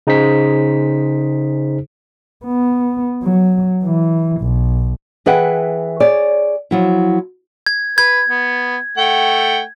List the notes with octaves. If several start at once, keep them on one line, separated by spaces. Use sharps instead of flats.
C#3 D#4 G#4 C5 B6
B3
F#3
E3
B1
E3 G#4 B4 E5 F#5 G5
G#4 C#5 D5
F3 F#3 E4
G#6
B4 G#6
B3
A3 F#5 G5